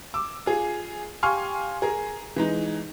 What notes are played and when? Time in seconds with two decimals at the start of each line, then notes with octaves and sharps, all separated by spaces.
0.14 D6 E6
0.46 F4 G#4
1.23 G4 F5 G#5 C6 C#6 F6
1.82 G#4 A#4
2.36 E3 G#3 D#4